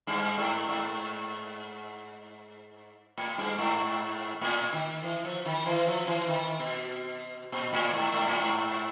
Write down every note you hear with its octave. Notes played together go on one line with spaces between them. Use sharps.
G2
G#2
G#2
A2
G2
G#2
A2
D#3
E3
F3
D#3
E3
F3
E3
D#3
B2
A#2
A2
G#2
G#2
A2
G#2